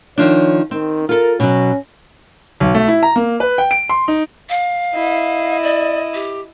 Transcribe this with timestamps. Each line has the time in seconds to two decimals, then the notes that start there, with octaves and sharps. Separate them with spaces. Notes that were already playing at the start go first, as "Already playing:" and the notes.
0.18 D#3 F3 D4 C#5
0.71 D#3 C4
1.09 F4 A4 A#4
1.40 B2 F#3 C#4
2.60 B1
2.74 A3
2.88 E4
3.03 A#5
3.16 A#3
3.40 B4
3.58 G5
3.71 D7
3.89 C6
4.08 D#4
4.50 F5
4.94 E4 D#5
5.63 D5
6.14 G4